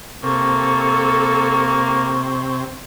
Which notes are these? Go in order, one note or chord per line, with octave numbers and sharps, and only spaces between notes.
C3 A#3 A4 C#6